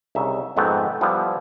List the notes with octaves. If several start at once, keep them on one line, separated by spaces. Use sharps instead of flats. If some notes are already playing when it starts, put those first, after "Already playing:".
C2 C#3 D#4 E5
F2 G#2 A3 B3 C4
F3 G3 B3 E4